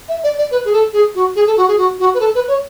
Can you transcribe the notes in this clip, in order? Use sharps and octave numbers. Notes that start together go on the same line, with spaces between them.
E5
D5
D5
B4
G#4
A4
G#4
F#4
G#4
A4
F#4
G#4
F#4
F#4
B4
A4
B4
C#5